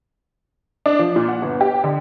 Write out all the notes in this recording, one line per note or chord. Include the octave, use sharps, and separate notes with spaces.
D4
F3
A#2
F#5
G1
G4
D3